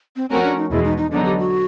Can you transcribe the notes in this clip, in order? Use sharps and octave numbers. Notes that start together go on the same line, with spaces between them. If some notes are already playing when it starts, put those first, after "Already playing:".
C4
F3 A3 C4 C#4 F#4 A#4
D4
D#4
E2 B2 G#3 E4
D#4
D#4
D3 F#3 B3 D4 D#4
G4
F#4